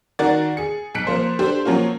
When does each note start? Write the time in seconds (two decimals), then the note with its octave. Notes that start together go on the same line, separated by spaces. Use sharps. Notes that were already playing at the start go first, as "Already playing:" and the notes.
0.19 D#3 F#4 A#4 D5 A6
0.57 G#4 C#7
0.94 B1 F#6 B6 C#7 D7
1.07 F3 A#3 C5
1.39 D4 G4 A4 C5
1.65 F3 F#3 A#3 C#4 F4